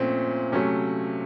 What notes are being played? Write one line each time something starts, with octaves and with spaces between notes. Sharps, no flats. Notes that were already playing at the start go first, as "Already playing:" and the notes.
Already playing: A#2 F3 A3 C4 C#4
C3 F#3 A3 C#4